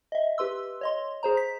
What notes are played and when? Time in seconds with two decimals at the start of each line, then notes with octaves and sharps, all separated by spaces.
0.12 D#5 E5
0.38 G4 B4 C6 E6
0.81 C#5 D#5 C6
1.23 G#4 C5 A#5
1.37 B6